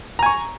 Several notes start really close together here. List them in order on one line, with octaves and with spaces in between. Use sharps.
A#5 G#5 C#6